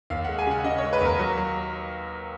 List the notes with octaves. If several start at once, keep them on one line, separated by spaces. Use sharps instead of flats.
D#2 F5
G#3 F#5
G#5
C#3 F#5
C#3 D#5
C#5
G#3
B4
D#2 A#4
F#3
F#3